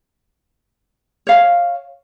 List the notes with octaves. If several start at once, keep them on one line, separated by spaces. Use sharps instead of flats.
C#5 F5